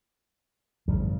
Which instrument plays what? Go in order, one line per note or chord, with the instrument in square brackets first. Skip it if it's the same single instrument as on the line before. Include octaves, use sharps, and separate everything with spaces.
[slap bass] G#1 F#2 C#3